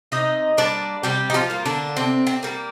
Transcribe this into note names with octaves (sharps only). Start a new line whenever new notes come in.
C3 D#4 D#5
G3 A#3 D4 D5
C3 G3 G4
D#4
F3 F4
G3 A#3
D3 D4
C3 C4
C4
G3 A#3